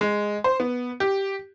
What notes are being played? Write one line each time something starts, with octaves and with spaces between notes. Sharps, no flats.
G#3
C5
B3
G4